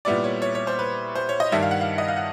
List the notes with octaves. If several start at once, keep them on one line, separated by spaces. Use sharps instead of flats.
A#2 G3 B3 E4 D5
C#5
C#5
C#5
C5
B4
C5
C#5
D#5
G2 D#3 G3 E5
F5
F#5
F5
D#5
F5
F#5